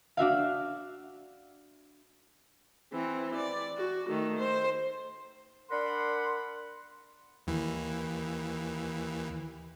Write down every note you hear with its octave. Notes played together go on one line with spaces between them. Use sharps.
D4 F#4 E5 F5
E3 C4
D5
F#4
D#3 A3
C5
D4 A#4 D5 F#5 B5 C6
D#2 E3